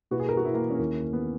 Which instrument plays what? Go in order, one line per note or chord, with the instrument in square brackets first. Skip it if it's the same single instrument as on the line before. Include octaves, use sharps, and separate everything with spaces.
[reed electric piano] B2 A#3 E4 B4 [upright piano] F#4
[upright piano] G#4
A#4
F#4
E4
A#3
C#4
[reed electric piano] D#2 D#3 A#3 E4 A#4
[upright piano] B3